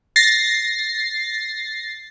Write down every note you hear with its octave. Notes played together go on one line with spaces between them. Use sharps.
A6 A#6 C7